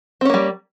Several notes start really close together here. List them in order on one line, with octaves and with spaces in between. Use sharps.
C4 C#4 A#3 G3